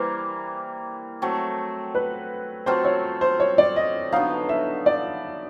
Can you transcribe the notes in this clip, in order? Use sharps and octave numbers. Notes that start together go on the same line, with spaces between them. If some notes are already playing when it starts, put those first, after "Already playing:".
Already playing: E3 G3 A#3 C5
F#3 A3 C4
B4
F#3 A3 C4 F4 C5
C#5
C5
C#5
D5
D#5
D3 F#3 B3 D#4 F5
E5
D5